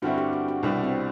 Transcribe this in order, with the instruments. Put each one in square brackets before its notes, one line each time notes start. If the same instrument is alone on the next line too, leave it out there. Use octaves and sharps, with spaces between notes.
[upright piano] G2 D3 G3 C4 E4 [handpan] F#4
[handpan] G4
F#4
F#4
[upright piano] C2 B2 G3 D4 [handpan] E4
[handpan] C4